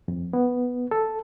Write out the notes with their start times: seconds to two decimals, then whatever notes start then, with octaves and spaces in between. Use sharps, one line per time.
0.08 F2
0.33 B3
0.91 A4